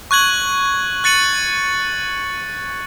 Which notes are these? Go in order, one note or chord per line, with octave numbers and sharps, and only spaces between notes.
C#6 F#6 G#6 F#7
F#6 A6 C#7 D#7 F#7